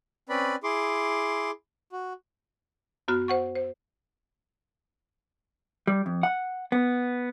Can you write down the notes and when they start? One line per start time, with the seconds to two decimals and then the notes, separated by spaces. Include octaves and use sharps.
0.29 C4 C#4 B4 D5 B5
0.64 E4 G#4 C6 D6
1.92 F#4
3.08 F#2 B3 F#4 F6
3.28 C5 F#5 C#6
3.56 C5
5.87 G3
6.06 F2
6.23 F#5
6.72 B3